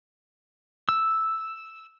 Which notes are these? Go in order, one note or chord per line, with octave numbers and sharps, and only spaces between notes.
E6